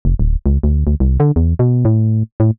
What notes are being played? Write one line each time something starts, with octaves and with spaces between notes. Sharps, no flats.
F1
D1
C#2
D2
D2
C2
D3
E2
B2
A2
A2